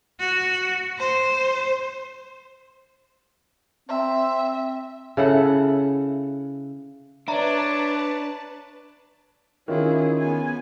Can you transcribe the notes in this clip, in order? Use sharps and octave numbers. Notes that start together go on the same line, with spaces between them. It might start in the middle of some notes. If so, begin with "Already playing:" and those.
F#4
C5
C4 E5
C#3 E4 A4 F#5
D4 B4 C#5 D5 E5 A5 A#5
D#3 C#4 E4 F4 G#4
B3 G#5